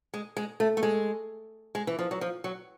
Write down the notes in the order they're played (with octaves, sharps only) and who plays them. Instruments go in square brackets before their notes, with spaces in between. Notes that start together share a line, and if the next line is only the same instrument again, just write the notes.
[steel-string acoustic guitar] G#3
G#3
A3
A3
G#3
G#3
E3
F3
F#3
F3
F#3